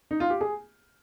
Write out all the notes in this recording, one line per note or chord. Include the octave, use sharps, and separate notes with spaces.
D#4
F4
G4
G#4